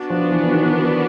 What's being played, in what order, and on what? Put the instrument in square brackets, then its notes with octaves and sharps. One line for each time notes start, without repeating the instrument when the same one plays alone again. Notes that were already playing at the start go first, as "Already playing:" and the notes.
Already playing: [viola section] B3 D4 F#4
[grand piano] F3
E3
D#3